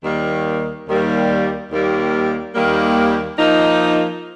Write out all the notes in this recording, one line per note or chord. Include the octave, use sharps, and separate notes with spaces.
D#2 D#3 G3 A#3
D#2 D#3 G3 A#3
D#2 D#3 G3 A#3
D#2 D#3 G3 A#3
F3 A#3 D#4